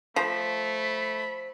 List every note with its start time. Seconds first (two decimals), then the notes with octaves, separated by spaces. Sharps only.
0.16 F3 A3 B5